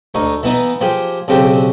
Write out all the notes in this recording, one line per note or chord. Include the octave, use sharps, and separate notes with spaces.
D2 D#4 C#6
E3 B3 D#4
F3 G4 G#4
B1 C#3 C4 G4